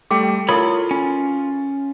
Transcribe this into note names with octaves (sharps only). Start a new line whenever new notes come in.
G3 A3 G4 G5 D6
E4 F4 A4 A#4 C#5 B5
C#4